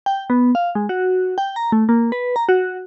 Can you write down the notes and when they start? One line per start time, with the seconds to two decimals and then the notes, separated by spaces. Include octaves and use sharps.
0.06 G5
0.30 B3
0.55 F5
0.75 G#3
0.89 F#4
1.38 G5
1.56 A#5
1.72 A3
1.89 A#3
2.12 B4
2.36 A#5
2.49 F#4